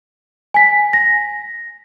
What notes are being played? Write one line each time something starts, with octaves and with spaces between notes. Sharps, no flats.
G#5 B6
A#6